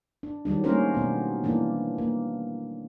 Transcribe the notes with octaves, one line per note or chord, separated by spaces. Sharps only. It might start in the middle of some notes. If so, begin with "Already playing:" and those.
D4
D#3 F#3 G3 D4
G3 A3 A#3 C#4 A#4 C5
B2 B3
E3 A#3 D4
A#3